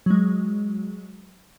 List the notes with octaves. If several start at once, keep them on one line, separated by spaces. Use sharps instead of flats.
F#3 G#3